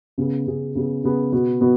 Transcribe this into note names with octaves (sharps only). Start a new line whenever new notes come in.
C#3 B3 G#4
C#3 B3 G#4
C#3 B3 G#4
C#3 B3 G#4
B2 B3 F#4
B2 B3 F#4